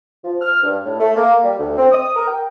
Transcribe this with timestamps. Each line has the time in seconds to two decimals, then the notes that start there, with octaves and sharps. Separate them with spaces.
0.25 F3
0.41 F6
0.63 G2
0.84 A2
1.00 A3
1.16 A#3
1.44 G3
1.59 D2
1.77 C4
1.92 D#6
2.16 A#4
2.28 G5